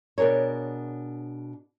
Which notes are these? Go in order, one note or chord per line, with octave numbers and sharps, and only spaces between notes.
B2 D4 G#4 A#4 C#5